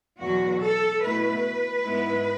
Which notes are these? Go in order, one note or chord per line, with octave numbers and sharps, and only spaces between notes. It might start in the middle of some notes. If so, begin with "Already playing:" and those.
E2 B2 F#3 F#4
A4
B2 A3 E4 B4
G#2 G#3 B3 E4